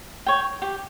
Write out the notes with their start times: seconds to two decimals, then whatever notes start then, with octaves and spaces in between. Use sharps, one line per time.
0.26 C#5 G5
0.62 G4